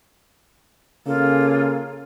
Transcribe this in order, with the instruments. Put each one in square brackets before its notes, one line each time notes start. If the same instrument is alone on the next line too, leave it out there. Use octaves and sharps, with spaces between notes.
[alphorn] C#3 [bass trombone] A#3 [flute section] F4 G#4 [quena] A4